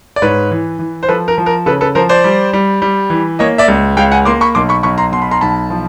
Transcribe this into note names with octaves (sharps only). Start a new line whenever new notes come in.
D5
G#2 B4 C#5
E3
E3
C5
F3 A4 B4
A#4
F3
A#4
C#3 A4 B4
A4 B4
F3 A#4 C5
C5 D5
G3
G3
G3
E3
A#3 C#5 D#5
D5 E5
C#2
C#2 F5 G5
F#5 G#5
A#3 C6 D6
B5 C#6
B1 C6 D6
B5 C#6
B1 B5 C#6
A#5 C6
B2 C6
B5
A#5 C6
B1 A5 B5
F3